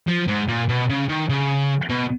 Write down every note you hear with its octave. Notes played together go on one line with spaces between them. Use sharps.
F3
G#2
A#2
B2
C#3
D#3
C#3
B2